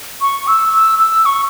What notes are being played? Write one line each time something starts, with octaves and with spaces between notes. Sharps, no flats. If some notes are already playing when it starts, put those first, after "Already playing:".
C#6
E6
E6
E6
C#6